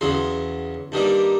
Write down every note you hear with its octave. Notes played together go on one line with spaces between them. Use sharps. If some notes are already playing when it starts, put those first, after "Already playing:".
E2 C#3 F#3 C6
G2 D#3 G3 A#3